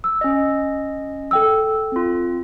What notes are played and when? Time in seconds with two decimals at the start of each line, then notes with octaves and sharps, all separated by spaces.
0.04 E6
0.21 C#4 D#5
1.31 A4 G5 E6
1.92 C4 F4